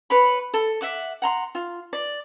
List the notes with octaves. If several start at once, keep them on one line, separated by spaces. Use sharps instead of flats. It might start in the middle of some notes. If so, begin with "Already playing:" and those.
B4 C#5 B5
A4
E5 F#5 D6
F#5 A#5 C6
F4
D5